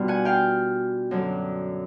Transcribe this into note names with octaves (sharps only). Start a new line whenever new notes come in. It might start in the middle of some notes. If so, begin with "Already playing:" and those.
Already playing: B2 G3 B3 D4 F4
F#5 G#5
F5 G5
F#2 D3 F#3